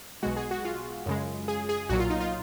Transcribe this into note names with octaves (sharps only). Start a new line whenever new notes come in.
B1 B2 G#3 F#4
G#4
F#4
F4
F#2 C#3 G#3
G#4
G#4
B1 A#2 F#3 F#4
F4
D#4
F4